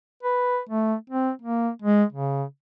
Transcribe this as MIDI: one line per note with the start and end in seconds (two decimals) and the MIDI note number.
0.23 0.59 71
0.69 0.94 57
1.10 1.31 60
1.42 1.69 58
1.82 2.04 56
2.13 2.43 49